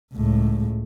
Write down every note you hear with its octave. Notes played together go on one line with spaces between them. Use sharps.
C#2 A2